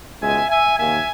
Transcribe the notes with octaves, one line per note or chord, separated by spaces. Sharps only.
C#2 B2 G#3 E5 G#5
E5 G#5
D#2 D#3 A#3 E5 G#5